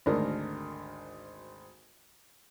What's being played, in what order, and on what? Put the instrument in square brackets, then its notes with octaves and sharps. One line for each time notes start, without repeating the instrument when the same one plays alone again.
[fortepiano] G#1 D2 G#3 D4 A#4